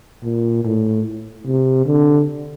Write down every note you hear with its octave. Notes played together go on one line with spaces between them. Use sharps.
A#2
A2
C3
D3